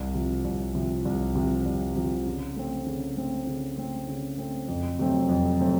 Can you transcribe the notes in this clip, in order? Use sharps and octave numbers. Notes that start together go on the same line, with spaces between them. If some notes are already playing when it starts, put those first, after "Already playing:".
Already playing: C2
C3 F3
C2
C3 F3
C2
C3 F3
C2
C3 F3
C#3
A3 C4
C#3
A3 C4
C#3
A3 C4
C#3
A3 C4
F2
C3 F#3 A3 C4
F2
C3 F#3 A3 C4